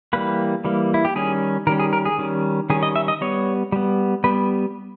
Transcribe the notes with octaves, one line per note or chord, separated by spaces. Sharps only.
E3 G3 A#3 B4
E3 G3 A#3
E4
G4
D#3 G3 C#4 G#4
D#3 G3 C#4 A#4
G#4
A#4
G#4
D#3 G3 C#4
D#3 G3 C#4 G#4
D#5
E5
D#5
G3 B3 C#5
G3 B3
G3 B3 B4